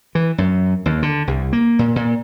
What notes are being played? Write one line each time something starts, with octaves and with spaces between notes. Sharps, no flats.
E3
F#2
D#2
D3
C2
A#3
A#2
A#2